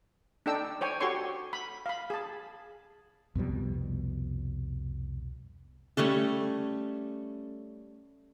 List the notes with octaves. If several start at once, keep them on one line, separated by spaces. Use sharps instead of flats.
D4 D#4 A4 G5 E6
C5 C#5 G5 G#5
F#4 G4 A4 C#5 C6 C#6
B5
F5 B5
G#4 A5
C2 F2 B2 G3
G3 A3 C#4 A4